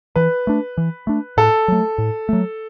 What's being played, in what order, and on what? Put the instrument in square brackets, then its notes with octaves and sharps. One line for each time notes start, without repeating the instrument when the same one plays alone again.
[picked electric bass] E3 [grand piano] B4
[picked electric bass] A3 D4
E3
A3 D4
[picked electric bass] A2 [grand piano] A4
[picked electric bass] F#3 A3
A2
F#3 A3